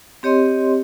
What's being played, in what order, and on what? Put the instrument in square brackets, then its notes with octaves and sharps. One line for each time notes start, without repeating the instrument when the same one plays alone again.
[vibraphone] C4 G4 C#5 D#5 C6